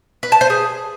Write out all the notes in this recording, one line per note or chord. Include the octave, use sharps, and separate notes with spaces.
B4
A5
C5
G#4